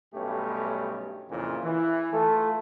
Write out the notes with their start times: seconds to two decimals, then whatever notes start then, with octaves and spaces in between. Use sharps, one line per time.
0.14 B1 G2 A3 C#4 G4
1.29 F2 A#2 C#3 E3
1.63 E3
2.13 A3 F4 A4